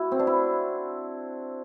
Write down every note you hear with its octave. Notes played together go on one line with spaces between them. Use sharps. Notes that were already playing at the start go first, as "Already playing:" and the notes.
Already playing: E4 F#4
C4
D4
E4